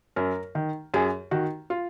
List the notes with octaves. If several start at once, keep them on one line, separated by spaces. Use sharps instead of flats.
F#2 A#4
D#3
F#2 G#4
D#3 F#4
F4